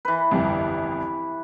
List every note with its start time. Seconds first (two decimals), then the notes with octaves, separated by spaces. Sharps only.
0.05 E3 B4
0.31 G1 C2 F2